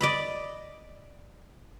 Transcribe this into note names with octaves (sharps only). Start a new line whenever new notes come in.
D5 D#5 B5